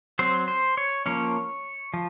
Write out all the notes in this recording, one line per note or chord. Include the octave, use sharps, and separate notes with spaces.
F#3 C4 C5
C5
C#5
F3 A#3 C#4 C#5
F3